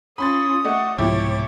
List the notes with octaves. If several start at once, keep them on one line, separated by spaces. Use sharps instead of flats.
C#4 F4 B5 C6 D#6 A6
A3 F#4 D5 D#5
C2 G#2 B2 F3 E4 G4 C#5 D6